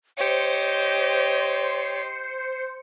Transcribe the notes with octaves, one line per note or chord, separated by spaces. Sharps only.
G4 C5 C#5 D#5 C#7